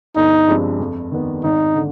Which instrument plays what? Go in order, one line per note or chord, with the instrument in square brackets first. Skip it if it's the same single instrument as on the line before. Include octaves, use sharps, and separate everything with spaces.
[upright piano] G1 [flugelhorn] D#4
[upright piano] G2 F3 G#3 C4
F2
D#3 B3
[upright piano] G#1 [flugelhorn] D#4
[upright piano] D3